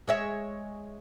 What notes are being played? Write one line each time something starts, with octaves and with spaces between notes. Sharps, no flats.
G#3 C#5 E5